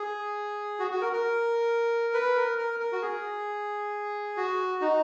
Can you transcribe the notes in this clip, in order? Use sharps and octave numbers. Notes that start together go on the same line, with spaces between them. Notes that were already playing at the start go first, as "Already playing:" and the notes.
Already playing: G#4
F#4
F#4
A#4
A#4
B4
A#4
A#4
A#4
F#4
G#4
F#4
D#4